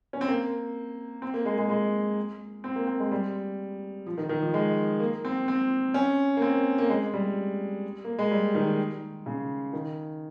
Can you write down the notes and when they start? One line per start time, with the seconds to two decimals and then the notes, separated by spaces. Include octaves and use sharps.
0.13 C#4
0.21 C4
0.28 A#3
1.22 C4
1.34 A#3
1.46 G#3
1.58 G#3
1.70 G#3
2.64 C4
2.76 A#3
2.87 C4
3.00 G#3
3.11 G3
4.06 F3
4.18 D#3
4.29 D#3
4.42 F3
4.54 G#3
5.00 A#3
5.25 C4
5.48 C4
5.94 C#4
6.37 A#3
6.42 C4
6.78 A#3
6.89 G#3
7.14 G3
8.04 A#3
8.19 G#3
8.31 G3
8.55 D#3
9.26 C#3
9.73 D#3